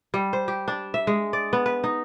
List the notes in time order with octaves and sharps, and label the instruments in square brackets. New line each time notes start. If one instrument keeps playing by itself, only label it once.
[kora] G3
C5
G4
D4
E5
G#3
D5
B3
B4
D#4